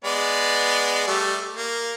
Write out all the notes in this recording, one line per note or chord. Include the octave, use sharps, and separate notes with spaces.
G#3 B3 D5
G3 A3
A#3